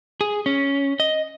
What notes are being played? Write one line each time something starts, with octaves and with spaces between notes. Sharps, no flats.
G#4
C#4
D#5